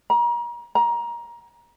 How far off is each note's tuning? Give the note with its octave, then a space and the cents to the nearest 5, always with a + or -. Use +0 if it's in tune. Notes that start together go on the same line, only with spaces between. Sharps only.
A#5 +35
A#5 +20